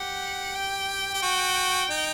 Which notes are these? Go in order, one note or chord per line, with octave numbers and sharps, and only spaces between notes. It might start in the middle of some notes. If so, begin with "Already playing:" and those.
Already playing: G4 F#5
G5
G4
F#4
D#4